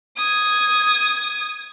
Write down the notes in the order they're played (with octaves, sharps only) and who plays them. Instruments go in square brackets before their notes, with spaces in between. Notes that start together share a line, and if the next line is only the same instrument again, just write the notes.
[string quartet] D#6 G#6